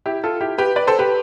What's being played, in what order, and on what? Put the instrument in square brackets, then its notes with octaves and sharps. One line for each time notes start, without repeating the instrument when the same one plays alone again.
[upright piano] E4 G4
F4 A4
E4 G4
G4 B4
B4 D5
A4 C5
G4 B4